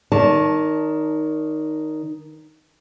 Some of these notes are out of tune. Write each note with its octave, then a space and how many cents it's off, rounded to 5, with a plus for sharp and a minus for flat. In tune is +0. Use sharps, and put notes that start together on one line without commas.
D#3 +0 D5 -45 A5 +0